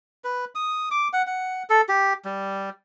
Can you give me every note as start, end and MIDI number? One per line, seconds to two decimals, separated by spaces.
0.24 0.45 71
0.55 0.89 87
0.91 1.08 86
1.13 1.22 78
1.27 1.63 78
1.70 1.81 69
1.89 2.13 67
2.25 2.70 55